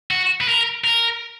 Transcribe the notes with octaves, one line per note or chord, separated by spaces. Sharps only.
F#4
B4
A#4
A#4